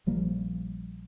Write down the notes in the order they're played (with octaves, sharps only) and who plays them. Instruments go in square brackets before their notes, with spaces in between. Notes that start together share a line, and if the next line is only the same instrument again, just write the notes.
[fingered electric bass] A#1 F3 G3 A#3